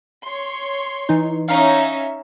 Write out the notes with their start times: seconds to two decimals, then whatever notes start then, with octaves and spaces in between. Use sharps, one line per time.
0.24 C#5 C6
1.09 E3 D#4
1.48 C#4 D#4 E5 F5 A#5